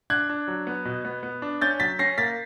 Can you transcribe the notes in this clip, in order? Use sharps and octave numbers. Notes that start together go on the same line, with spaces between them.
D4 F#6 G#6
D4
F#3
B3
B2
B3
B3
D4
C#4 G6 A6
F#3 A6 B6
C#4 A#6 C7
A#3 A6 B6